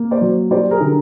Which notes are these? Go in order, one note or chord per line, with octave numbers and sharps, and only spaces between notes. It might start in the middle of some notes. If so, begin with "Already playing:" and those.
Already playing: A#3
C5 D5
F#3
G3 C5 D5
G#4 A#4
D3